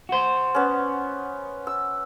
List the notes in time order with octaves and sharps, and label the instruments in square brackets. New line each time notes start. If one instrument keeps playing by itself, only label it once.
[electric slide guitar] F#4 C5
[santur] B3 C#4
E6